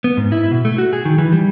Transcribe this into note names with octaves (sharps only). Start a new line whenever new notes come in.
B3
G#2
E4
B2
A3
F#4
G#4
D#3
E3
G3